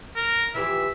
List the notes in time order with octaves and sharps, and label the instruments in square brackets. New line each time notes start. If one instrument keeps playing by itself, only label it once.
[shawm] A#4
[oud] E3 F3 G4 [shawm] E5